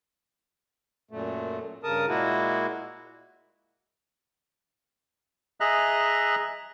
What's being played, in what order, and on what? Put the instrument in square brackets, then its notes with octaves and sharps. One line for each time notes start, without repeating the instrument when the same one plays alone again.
[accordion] F#2 A#2 A3
G2 C#3 A#4 A5 D#6
A#2 G#3 A#3 E4 F#4
[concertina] G#4 D#5 E5 A#5 F#6